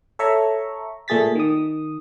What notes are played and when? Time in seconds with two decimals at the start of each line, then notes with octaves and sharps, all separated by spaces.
0.19 A4 C#5 E5 A#5 C#6
1.08 A#2 A3 G#4 A6 B6
1.35 D#3 D#6